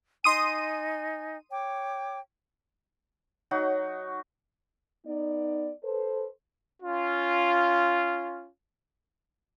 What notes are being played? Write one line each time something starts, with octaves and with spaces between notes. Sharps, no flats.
D#4 G#5 C6 D#6 D#7
C#5 G5 D6
F#3 D#4 F#4
B3 D#4 D5
A4 B4 C5
C#4 F4